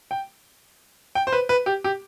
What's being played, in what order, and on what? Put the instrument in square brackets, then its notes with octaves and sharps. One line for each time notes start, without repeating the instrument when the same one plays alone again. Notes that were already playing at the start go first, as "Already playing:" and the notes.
[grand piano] G5
G5
C5
B4
B4
G4
G4